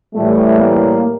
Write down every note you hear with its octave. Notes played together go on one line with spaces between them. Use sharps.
A2 E3 G3 A3
A#3